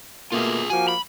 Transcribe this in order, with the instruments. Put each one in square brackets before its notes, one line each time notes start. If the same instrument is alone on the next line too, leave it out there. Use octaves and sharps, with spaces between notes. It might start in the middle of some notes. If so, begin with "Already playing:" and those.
[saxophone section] B2 A3 A#3 [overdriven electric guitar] F4 G#4
[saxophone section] F3 A#3 F#4 [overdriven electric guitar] G#5
[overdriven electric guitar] B5